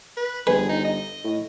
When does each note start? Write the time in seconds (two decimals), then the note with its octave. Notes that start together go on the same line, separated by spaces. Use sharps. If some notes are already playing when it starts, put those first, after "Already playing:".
0.17 B4
0.47 G1 G#4 B4
0.69 D#4
0.85 D#5
1.24 A2